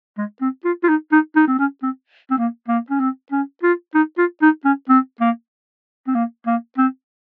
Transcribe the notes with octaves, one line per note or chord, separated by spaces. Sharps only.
G#3
C4
F4
F4
D#4
D#4
D#4
C4
C#4
C4
C4
A#3
A#3
C#4
C4
C#4
F4
D#4
F4
D#4
C#4
C4
A#3
C4
A#3
A#3
C4